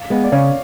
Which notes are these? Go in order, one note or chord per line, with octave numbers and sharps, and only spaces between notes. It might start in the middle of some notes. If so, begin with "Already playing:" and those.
Already playing: F5
G#3 B3
D5
C#3 C#5 F5